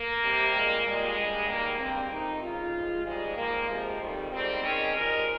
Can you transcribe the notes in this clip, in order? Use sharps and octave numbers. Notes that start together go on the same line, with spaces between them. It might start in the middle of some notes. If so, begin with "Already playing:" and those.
Already playing: A#3
C3 G3
A#2 G#3
A#2 G3 G#3
G2 G3
G#2 D#3 G3 A#3
G2 G3 C4
F2 C3 D#3 D#4
F2 C#3 G#3 F4
C3 F3 G#3
G#2 G3 G#3
G#2 F3 G#3 A#3
C3 F3 G#3
F2 D#3 G3
G#2 G3 C4
G#2 D#3 G#3 C#4
G2 F3 G#3 A#4